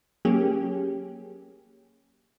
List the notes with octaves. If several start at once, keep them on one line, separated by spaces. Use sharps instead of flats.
F#3 A#3 C#4 G4 G#4